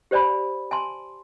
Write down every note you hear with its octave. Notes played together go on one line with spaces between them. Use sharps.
G4 C5 D5 G#5 B5
G#5 A5 C6